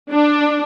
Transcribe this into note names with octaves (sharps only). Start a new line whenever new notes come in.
D4